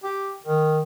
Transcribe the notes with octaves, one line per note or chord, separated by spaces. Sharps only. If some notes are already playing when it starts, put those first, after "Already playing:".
G4
D#3